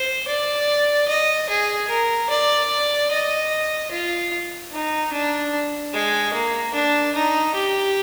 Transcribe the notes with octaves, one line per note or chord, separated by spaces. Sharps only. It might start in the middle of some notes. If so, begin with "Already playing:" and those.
Already playing: C5
D5
D#5
G#4
A#4
D5
D#5
F4
D#4
D4
G#3
A#3
D4
D#4
G4